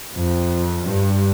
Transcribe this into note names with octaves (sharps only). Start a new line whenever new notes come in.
F2
G2